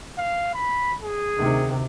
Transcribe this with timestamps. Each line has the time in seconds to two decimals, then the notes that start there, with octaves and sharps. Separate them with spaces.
0.18 F5
0.54 B5
1.02 G#4
1.37 D2 C3 D#3